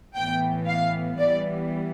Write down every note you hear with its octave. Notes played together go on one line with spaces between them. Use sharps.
A2 E3 B3 G5
F5
E3 G3 B3 D5